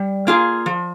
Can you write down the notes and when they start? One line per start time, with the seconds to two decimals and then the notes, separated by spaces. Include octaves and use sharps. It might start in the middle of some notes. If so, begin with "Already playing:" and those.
Already playing: G3
0.27 A#3 F4 G#4
0.66 F3